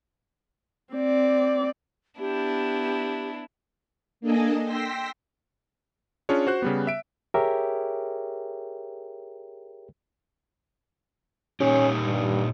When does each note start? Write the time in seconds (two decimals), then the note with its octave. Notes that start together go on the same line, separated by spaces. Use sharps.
0.93 C4 D5
2.19 B3 D4 E4 G4
4.21 A#3 D4 A4 D#5 G#5
4.63 G5 C6 E6 A#6 B6
6.29 C#4 D4 F4 G#4 C#5
6.47 F#4 C5 F#6
6.62 C#3 G3 B3
6.87 E5 D7
7.34 G4 G#4 A#4 C#5 E5 G5
11.60 A#2 C#4 D#4 G4
12.05 G2